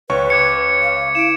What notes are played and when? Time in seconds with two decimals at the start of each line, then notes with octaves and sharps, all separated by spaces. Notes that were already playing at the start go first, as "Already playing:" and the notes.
0.10 C#2 B4 C#5 C#6
0.30 D6 G#6 C#7
0.82 F5
1.15 E4 D7 E7